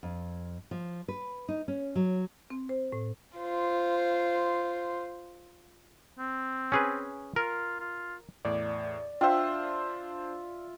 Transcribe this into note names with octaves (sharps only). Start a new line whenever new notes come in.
F2
F3
B4
D#4
C#4
F#3
C4
C5
A2
F4 C5
C4
C#4 G#4 B4
F4 A#4
F4
E2 A2 D5
D4 F4 C5 E5 G5